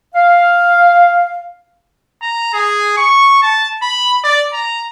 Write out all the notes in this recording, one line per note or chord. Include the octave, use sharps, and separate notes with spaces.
F5
A#5
G#4
C#6
A5
B5
D5
A#5